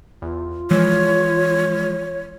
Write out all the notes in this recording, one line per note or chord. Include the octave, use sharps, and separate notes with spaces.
E2 F4
E3 F3 G#3 C#5